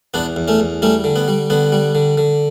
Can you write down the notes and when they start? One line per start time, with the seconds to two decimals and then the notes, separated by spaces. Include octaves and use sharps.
0.14 E2 B3 D4
0.36 E2
0.48 A3 C#4
0.60 E2
0.82 G3 A3 C#4
1.04 D3
1.16 B3
1.28 G3
1.50 D3 B3
1.72 G3
1.95 D3
2.18 D3